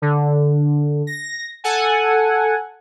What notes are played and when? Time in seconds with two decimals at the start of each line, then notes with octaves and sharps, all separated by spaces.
0.02 D3
1.07 A#6
1.64 A4 F#5 G#5